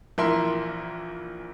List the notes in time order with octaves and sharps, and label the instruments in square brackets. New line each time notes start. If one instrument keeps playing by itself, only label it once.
[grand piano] A#1 E3 A#4 E5 C6